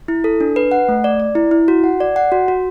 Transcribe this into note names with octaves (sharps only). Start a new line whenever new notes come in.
E4
A4
D4
B4
F#5
A3
D5
D5
E4
E4
F#4
F#5
D5
F#5
F#4
F#4